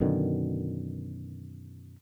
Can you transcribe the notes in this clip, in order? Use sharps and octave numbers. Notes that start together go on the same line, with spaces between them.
F#2 B2 D3 D#3